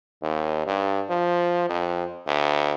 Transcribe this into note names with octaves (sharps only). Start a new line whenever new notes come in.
D#2
G2
F3
F2
D2